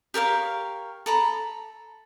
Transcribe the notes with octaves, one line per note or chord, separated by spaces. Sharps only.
G4 A#4 C#5 F5
A4 A#5 B5